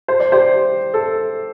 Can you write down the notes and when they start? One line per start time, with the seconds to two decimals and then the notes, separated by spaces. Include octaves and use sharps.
0.08 C5
0.20 D5
0.32 G4 C5
0.94 A4